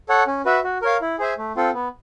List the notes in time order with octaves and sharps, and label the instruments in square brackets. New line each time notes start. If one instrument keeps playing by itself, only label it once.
[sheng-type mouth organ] A4 C#5 F#5
C#4
F#4 B4 E5
F#4
A#4 C#5 F5
E4
G#4 C5 E5 G#5
A3
C4 F4 A4
B3